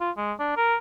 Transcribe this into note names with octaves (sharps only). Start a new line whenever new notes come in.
F4
G#3
D4
A#4